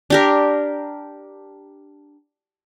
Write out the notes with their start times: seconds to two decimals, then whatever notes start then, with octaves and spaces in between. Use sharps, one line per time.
0.10 D4 G4 A#4